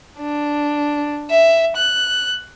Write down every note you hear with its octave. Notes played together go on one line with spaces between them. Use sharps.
D4
E5
F#6